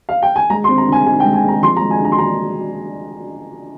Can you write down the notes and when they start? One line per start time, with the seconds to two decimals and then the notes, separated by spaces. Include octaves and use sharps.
0.09 F5
0.23 G5
0.36 G#5
0.50 G#3 A#5
0.64 C6
0.69 C4
0.78 A#5
0.87 D3 G#5
1.06 D#4 G#5
1.20 G5
1.25 G#3
1.34 G#5
1.44 C4 A#5
1.63 F3 C6
1.77 A#5
1.82 G#3
1.91 G#5
2.00 D3 A#5
2.12 C6
2.18 D4 A#5